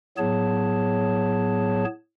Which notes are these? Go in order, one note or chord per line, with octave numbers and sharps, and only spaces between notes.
A2 F#3 B3 G#4 C#5 A5